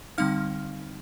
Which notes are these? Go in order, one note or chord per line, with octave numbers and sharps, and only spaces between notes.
D3 G3 C4 D#4 F5 F6